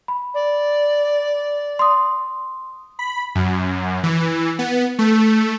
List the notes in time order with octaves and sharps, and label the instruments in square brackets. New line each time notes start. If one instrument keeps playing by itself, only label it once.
[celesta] B5
[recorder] D5
[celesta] C6 D#6
[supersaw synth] B5
F#2
E3
B3
A3